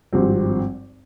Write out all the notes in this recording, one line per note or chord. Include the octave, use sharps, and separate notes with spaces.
G#1 G2 F3 C4 G4